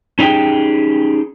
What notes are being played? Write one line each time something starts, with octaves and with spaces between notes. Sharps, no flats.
C#4 D#4 G4 G#4 G5